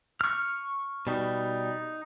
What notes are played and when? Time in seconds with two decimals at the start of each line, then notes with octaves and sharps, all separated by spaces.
0.21 C#6 F6
1.07 B2 G3 D#4